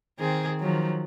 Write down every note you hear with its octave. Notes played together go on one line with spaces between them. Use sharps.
D#3 C4 G#4
D#3 F3 F#3